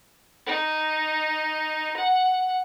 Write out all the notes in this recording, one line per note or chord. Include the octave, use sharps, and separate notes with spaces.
D#4
F#5